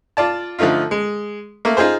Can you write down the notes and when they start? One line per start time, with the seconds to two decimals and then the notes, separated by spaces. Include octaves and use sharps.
0.17 F4 D5 A5
0.59 D3 F3 A3 D#4 F4
0.91 G#3
1.65 A3 A#3
1.77 D#4 F4 G#4 C5